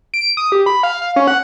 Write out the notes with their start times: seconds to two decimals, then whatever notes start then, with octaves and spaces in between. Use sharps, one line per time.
0.14 D7
0.37 D#6
0.52 G4
0.66 B5
0.83 F5
1.02 F5
1.16 C#4
1.28 F#5